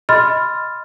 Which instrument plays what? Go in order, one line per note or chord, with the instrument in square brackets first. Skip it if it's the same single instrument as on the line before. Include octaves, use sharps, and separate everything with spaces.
[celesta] D#5 B5 C6 F6 A6